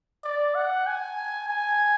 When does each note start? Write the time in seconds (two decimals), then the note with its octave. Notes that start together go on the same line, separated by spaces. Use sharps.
0.24 D5
0.55 F#5
0.87 G#5
1.48 G#5